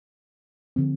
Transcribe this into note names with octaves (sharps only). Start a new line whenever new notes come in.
D3 F3 C4